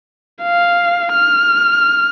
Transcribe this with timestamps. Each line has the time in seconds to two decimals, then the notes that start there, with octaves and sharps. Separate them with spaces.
0.43 F5
1.13 F6